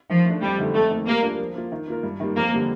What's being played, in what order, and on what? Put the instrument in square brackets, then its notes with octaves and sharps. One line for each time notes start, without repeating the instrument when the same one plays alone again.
[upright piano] D#3 [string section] F3
[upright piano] A3 D4
[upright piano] F2 [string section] G3
[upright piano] D3 A3 D#4 A4
[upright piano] F2 [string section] A3
[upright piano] D#3 A#3
[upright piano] G3 [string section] A#3
[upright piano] D4 F4 A#4
F3
A#3 F4
D#3
A#3 F4 A#4
G2
D#3 G3 A#3
[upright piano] F2 [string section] A#3
[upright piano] D3 G3 A#3